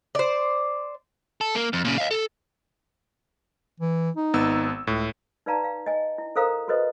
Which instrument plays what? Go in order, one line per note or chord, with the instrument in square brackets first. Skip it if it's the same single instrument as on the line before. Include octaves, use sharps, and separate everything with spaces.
[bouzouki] C5 D5
[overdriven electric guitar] A4
A#3
F2
A#2 C#3
D#5 F5
A4
[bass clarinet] E3
D#4
[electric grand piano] G#1 B3 E6
[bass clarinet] C#2 [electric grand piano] A2
[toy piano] D#4 B4 D5 F5 A5 A#5
F5
D#5 G#5
E4
A4 A#4 C5 F5 A#5 D#6
F#4 A4 B4 C5 D#5